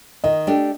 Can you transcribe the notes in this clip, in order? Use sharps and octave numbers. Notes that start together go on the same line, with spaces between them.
D#3 D#5
A3 D4 G4